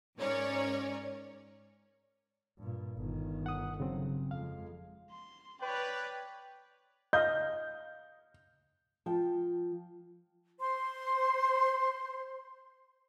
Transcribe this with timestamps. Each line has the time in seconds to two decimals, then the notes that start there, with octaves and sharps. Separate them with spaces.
0.18 G#2 C#4 A#4 C#5 D5
2.59 G2 A#2
2.97 G1 D#3
3.46 F#5 D#6
3.80 C#3 F#3 C4
4.31 F2 G#3 F5
5.10 C6
5.62 B4 C#5 D5 G5
7.13 D#5 F5 G6
9.06 F3 G5
10.60 C5 C6